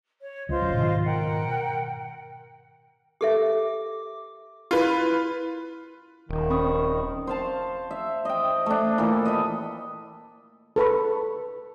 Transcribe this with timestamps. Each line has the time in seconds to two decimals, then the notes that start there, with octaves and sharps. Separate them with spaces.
0.21 C#5
0.49 C#2 F4 C5 D#5
0.61 F#1 F#2
0.75 G#2 B2 D#3
1.04 A#4 F#5 G5
3.21 G4 A4 E5 D6
4.71 E4 F4 B4
6.29 D#1 D#3
6.50 C4 C#4 B5 C#6 D#6
7.27 C5 F5 A5
7.91 E5
8.25 D#5 G5
8.66 A3 D4
8.98 A#2 E3 A4
9.25 D#5 B5
10.76 A4 B4 B5 C#6